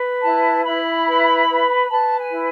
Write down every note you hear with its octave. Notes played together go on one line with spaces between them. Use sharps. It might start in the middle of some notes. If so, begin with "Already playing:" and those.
Already playing: B4
E4 A5
E4 B5
B4
B4
B4 A5
G#5
E4